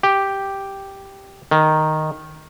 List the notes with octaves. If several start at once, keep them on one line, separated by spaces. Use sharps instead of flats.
G4
D#3